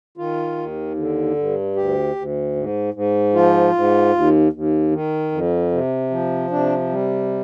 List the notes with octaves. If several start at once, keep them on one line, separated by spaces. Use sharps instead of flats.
D#3 F4
D#2
D3
G2
D2 G4
D2
G#2
G#2
F3 F4
G#2
D#2
D#2
D#3
F2
C3
F3
C3 D4
G3